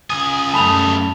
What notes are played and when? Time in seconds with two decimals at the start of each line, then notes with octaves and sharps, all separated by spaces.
0.10 C#2 G#5 D#6
0.54 F#2 G3 A3 A5 B5 F7